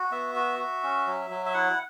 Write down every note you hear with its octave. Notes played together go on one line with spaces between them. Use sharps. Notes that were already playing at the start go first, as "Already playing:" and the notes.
Already playing: F#4
B3 E5
F#4
F#4
C#4
F#3
F#3
E5
E4 F#5